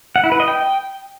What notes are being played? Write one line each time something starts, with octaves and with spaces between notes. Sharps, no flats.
F#5
E4
B4
D#5
G5